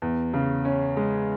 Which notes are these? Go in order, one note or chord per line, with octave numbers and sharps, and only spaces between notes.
E2
C#3
C#4
G#3